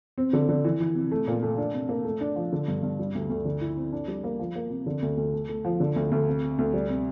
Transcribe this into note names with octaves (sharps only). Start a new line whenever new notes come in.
C4
D3
D3
E3
E3
C3
A3
A#2
A3
D4
C3
A#3
A3
D4
F3
D3
G2
G2
G3
D2
D2
D3
E4
C4
D4
G3
A#3
F3
A#3
C3
D3
D2
D2
A3
A3
F3
D3
D2
D2
C3
C3
D2
G3
C3